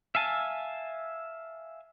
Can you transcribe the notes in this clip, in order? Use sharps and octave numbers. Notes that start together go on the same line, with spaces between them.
E5 F5 G#5 A5